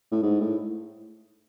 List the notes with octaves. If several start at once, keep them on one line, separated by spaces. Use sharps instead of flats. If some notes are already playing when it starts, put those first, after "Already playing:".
A2
G#2
A2